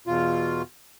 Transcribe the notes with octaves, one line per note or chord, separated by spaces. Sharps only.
E2 B2 F4